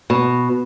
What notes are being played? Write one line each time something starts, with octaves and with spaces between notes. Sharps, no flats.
B2